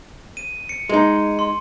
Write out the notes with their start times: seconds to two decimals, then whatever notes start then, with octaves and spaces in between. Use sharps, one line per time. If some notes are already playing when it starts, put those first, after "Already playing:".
0.37 D#7
0.69 C#7
0.89 G#3 D#4
1.39 C6